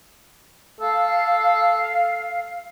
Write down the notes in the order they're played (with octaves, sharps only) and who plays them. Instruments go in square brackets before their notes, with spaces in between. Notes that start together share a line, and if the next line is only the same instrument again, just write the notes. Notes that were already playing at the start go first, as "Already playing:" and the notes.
[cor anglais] A4 [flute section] F5